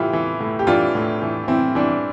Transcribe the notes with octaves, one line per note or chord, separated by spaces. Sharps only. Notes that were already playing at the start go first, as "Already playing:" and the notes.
Already playing: A2 E3 E4 F4 G4
E3
A2
G4
E3 D4 F4
A2
E3
E3 C4 E4
E3 D4